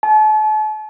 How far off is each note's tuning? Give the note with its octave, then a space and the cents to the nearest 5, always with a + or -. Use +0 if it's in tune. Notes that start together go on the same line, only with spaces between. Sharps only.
A5 -40